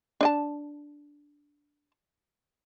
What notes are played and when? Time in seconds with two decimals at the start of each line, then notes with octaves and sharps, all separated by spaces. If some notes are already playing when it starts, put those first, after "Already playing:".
0.21 D4 D#5 A5